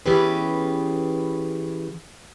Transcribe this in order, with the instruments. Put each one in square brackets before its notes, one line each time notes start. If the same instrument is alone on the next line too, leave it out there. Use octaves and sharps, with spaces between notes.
[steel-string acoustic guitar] E3 B3 C#4 G4 G#4 B4